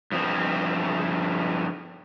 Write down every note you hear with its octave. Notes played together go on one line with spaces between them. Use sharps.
G2 F3 C4